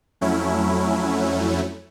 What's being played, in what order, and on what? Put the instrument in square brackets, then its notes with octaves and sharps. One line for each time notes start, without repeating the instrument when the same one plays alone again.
[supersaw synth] F2 F#3 A3 C#4 E4